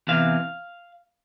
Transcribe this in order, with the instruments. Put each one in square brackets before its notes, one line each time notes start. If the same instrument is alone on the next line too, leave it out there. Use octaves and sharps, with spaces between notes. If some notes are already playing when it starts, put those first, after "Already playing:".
[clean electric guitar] E2 C3 E3 F5